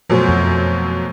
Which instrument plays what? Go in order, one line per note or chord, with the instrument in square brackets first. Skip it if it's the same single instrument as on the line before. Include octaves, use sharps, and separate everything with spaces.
[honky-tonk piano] F#2 B2 F#3 [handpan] F3 A3 C5
[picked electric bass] F2